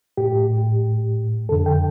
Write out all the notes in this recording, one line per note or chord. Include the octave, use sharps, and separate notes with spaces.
A2 G4
F2 D3 A4
G5